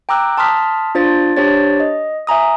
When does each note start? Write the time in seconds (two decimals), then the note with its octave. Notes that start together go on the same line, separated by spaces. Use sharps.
0.09 G5 A#5 D6 E6 F#6
0.38 A5 C6 D#6 F6 B6
0.95 D4 F4 C5 A6
1.36 D4 G4 C5 C#5 A6
1.80 D#5
2.27 E5 G#5 A#5 D#6